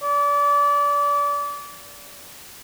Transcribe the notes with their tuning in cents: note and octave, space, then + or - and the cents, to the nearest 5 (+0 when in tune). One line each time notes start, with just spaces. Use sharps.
D5 -30